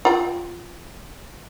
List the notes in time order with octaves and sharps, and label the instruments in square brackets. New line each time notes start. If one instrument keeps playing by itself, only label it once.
[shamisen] F4 G5